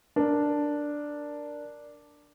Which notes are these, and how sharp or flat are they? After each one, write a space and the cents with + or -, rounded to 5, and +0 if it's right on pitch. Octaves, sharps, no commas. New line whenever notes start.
D4 +0 A#4 +0